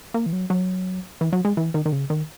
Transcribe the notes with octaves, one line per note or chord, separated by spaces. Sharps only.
A#3
E3
F#3
F#3
E3
F#3
G#3
E3
D#3
D#3
C#3
D#3